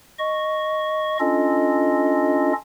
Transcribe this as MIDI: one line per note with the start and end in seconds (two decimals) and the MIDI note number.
0.19 1.17 75
0.19 1.17 85
1.20 2.53 61
1.20 2.53 62
1.20 2.53 65
1.20 2.53 69
1.20 2.53 75